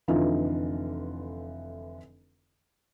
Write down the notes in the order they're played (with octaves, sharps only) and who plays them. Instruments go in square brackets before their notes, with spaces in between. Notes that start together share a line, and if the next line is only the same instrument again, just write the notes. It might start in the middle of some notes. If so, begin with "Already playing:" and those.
[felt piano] F1 D3 E3 D#4 F4